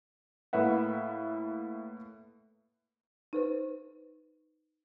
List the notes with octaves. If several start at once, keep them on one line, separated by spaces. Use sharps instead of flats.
A2 A#3 B4 E5 F#5
D#4 B4 C5